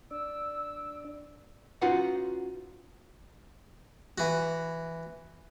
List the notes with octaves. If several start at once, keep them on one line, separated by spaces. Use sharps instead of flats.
D4 D5 E6
C#4 D#4 F4 F#4 B4 F#5
E3 F#4